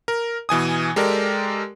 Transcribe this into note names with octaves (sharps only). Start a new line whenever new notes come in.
A#4
B2 E3 G#5 D#6
G#3 G4 A4 A#4 D5